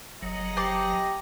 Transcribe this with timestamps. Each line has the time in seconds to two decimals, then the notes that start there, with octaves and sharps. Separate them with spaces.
0.22 F#1 F#3 G#4 D#5 A#5
0.57 G4 C5 A5 D6